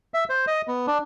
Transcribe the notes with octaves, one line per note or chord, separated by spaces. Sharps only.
E5
C5
D#5
B3
D4